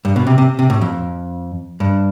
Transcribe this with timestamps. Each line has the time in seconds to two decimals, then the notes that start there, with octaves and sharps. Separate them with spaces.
0.05 G2
0.16 B2
0.27 C3
0.38 C3
0.59 C3
0.70 A2
0.82 F2
1.80 G2